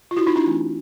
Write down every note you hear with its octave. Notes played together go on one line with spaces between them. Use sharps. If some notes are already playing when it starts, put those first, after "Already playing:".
F4
E4 F#4
D#4 F4
D4 E4
E3 A3 C4